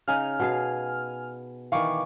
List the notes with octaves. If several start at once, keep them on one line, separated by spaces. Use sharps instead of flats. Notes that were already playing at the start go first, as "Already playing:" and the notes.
C#3 D#4 G#5 F6
B2 G#4 F5
D#3 E3 F5 C#6 D6